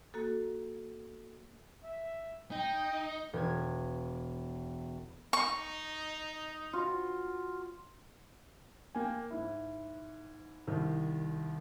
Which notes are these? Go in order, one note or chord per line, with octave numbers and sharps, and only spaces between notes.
A#3 F#4 A4
E5
D#4 G5
E1 G#6
D#4 C#6
F4 F#4
A#3 G5 G#5
G#2 E4
C2 D#3